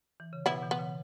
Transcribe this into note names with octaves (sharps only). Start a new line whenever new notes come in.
E3
C#3
B2 B3 E4
B2 E3
B3
C#3